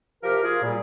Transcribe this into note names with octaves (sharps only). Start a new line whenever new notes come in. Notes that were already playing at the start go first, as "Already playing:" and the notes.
C3 F3 G4 A#4
F4 G#4
A#2 G3